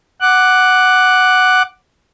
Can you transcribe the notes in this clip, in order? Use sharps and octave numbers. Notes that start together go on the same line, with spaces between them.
F#5 D6 F#6